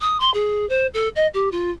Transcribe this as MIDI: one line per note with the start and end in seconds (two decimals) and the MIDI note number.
0.01 0.18 87
0.20 0.32 84
0.34 0.68 68
0.69 0.87 72
0.94 1.09 69
1.16 1.27 75
1.34 1.49 67
1.52 1.71 65